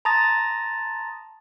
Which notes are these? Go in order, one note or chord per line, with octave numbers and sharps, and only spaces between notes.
A5 A#5 C6 D#6 A6 A#6